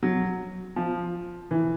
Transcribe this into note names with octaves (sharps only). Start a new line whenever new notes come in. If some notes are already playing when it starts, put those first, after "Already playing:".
F#3
F3
E3